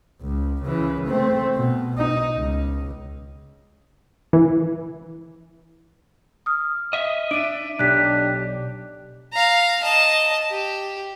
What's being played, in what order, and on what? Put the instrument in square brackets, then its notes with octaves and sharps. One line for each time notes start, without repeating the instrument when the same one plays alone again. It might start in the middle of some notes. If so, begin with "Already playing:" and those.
[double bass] C#2
C#3 E3
A3 C4
B2
D#4
C#2
[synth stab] E3
[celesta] D#6 F6
[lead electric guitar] D#5 E5
[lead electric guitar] D4 [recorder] E5 [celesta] D7 D#7
[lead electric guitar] B1 [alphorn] D4 [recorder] G4 [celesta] F#6 B6
[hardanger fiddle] F5 A#5
D#5 A5
G4